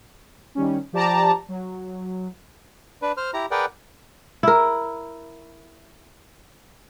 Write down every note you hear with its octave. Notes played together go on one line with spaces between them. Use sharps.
D#3 G3 C#4
F3 G4 D5 A5 A#5
F#3
D4 B4
C5 F6
E4 G4 A#5
G#4 A#4 B4 D5 F#5 G5
E4 A#4